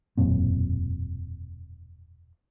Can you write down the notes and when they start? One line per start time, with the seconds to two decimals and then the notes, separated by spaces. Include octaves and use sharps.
0.17 E1 F#2 A#2 C4